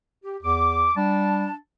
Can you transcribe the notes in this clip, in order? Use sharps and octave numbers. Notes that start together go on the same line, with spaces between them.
G4
E2 D6
G3 D4 A5